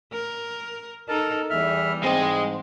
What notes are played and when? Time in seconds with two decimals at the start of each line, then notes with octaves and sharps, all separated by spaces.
0.13 A#4
1.09 D#4 A4 A#4 A5
1.50 E2 E3 G3 E5 F6
2.04 G#2 G#3 C4 D#5